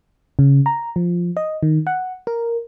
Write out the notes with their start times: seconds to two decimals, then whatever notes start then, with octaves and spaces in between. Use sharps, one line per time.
0.39 C#3
0.66 A#5
0.96 F3
1.37 D#5
1.63 D#3
1.87 F#5
2.27 A#4